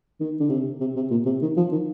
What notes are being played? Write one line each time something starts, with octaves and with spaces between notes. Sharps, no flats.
D#3
D3
C3
C3
C3
A#2
C3
D#3
F3
D#3